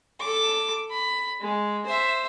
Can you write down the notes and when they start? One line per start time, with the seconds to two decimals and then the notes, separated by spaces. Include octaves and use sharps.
0.20 A4 D6
0.91 B5
1.41 G#3
1.86 C5 E5